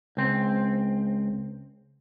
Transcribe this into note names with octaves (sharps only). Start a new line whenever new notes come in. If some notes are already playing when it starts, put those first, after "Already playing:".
C#2 C4